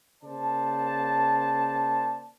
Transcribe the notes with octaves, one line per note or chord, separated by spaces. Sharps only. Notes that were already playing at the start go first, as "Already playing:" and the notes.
C#3 A#3 C5 D5 A5